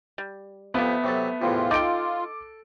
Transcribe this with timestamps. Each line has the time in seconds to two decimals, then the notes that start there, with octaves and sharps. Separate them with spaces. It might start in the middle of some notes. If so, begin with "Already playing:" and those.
0.18 G3
0.74 F2 F3 A3 B3 G4 E5
1.04 C3 F#3 A4
1.42 E2 A2 C3 F4
1.71 D#4 A4 G5 D6 D7